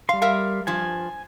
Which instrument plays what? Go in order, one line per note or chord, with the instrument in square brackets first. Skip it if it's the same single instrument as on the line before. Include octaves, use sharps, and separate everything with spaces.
[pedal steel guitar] G3 C6 [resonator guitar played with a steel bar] F5
[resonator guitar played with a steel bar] A#4 E5 F5
[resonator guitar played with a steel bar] G2 F3 [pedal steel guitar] G#5